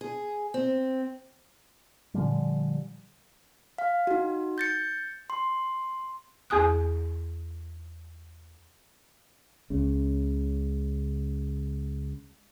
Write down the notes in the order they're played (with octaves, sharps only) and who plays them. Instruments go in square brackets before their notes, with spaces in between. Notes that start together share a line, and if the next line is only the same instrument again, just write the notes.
[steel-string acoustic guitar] G#4
C4
[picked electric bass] A#2 D3 F3 G3
[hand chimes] F5
D#4 F#4
G6 A6 C#7
C6
[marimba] E2 G#4 G#5 D#6 F#6
[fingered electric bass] C#2 C#3